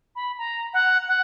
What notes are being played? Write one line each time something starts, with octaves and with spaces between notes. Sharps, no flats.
B5
A#5
F#5
F#5